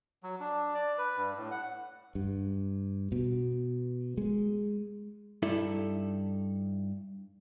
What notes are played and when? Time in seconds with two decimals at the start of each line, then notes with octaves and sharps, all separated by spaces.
0.23 F#3
0.40 D4
0.74 D5
0.98 B4
1.17 G2
1.37 A2
1.51 F#5
2.15 G2
3.12 B2
4.17 G#3
5.42 G2 D#4 E4 A4 E5